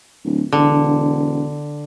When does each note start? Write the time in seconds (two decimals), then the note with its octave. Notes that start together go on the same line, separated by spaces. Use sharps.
0.24 D1
0.53 E1 D3